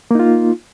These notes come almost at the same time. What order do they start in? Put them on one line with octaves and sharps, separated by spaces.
A#3 D#4 F4